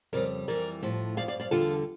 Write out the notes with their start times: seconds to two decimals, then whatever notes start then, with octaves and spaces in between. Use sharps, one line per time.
0.13 F2 C#3 G3 A#4 D5
0.47 F2 E3 G3 A#4 D5
0.82 A2 F3
1.17 G2 F3 D5 F5
1.28 D5 F5
1.40 D5 F5
1.51 E2 D3 G3 F4 A4